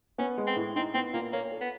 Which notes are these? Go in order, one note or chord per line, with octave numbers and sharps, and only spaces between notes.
B3 C#4
G#3
C4
A2
C4 D#4
B3 C4
A#2 A#3
A#3 C#5
A4
B3